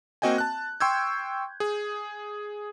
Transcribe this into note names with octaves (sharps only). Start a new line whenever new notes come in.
A#3 C4 F#4 D#5 G5 G#5
A5 F#6
G5 C6 C#6 E6 G6 G#6
G#4